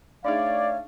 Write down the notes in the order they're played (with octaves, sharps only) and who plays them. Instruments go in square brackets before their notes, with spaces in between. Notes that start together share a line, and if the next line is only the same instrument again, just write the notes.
[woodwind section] A3 C#5 [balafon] D4 D#4 G#4 [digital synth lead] D5 [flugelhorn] F5